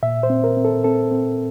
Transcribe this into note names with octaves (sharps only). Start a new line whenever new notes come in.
A#2 E5
C5
C4
A#4
C4
A4
C4 A4
C4